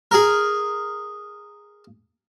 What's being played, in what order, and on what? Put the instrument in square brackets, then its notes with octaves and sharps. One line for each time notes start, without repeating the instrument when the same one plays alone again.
[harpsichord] G#4 A#4